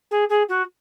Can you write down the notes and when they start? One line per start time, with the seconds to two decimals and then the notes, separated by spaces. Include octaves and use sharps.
0.11 G#4
0.29 G#4
0.49 F#4